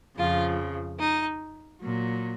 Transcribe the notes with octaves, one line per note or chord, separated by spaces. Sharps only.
F2 C#3 F3 F4
D#4
A#2 F#3